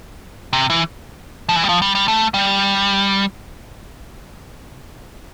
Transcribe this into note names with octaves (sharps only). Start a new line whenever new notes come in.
C3
E3
F3
E3
G3
F3
G3
G3
A3
G3